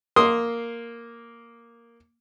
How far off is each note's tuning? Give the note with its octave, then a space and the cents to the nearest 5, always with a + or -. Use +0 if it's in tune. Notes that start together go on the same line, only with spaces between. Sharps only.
A#3 +0 C6 +0 D#6 +0